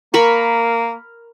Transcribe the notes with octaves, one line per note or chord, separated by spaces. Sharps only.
A#3 A#4 B5 C#6